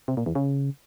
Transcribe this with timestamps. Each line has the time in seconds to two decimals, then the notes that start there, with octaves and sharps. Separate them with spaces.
0.08 C3
0.17 A#2
0.26 E2
0.35 C#3